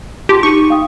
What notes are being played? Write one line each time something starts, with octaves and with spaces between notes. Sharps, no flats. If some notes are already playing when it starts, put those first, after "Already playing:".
F4 G4 A5 C6
D#4 C#6 D#7
F5 G5 D#6